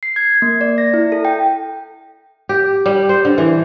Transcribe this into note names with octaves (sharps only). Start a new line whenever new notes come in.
C7
G#6
A#3
D5
A#6
E4
A4
G5
G4
G3
C5
D3
E3